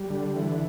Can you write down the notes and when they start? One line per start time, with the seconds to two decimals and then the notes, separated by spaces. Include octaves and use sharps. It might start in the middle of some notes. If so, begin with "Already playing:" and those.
Already playing: G3
0.10 D3
0.36 E3